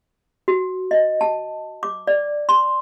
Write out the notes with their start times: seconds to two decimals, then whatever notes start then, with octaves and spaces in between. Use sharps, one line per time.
0.48 F#4
0.91 D#5
1.21 A5
1.83 D6
2.07 D5
2.49 C6